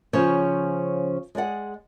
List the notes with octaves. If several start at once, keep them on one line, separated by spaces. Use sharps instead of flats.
C#3 F3 C#4 C5 C#5
G#3 G#4 D5 F#5